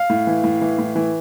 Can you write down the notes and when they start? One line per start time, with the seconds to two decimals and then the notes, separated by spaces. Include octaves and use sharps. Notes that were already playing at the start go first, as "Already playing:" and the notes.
Already playing: F5
0.10 A2
0.27 E3
0.44 A2
0.61 E3
0.78 A2
0.96 E3